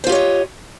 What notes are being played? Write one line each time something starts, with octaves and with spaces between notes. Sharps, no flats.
F4 G4 C5 C#5 D#5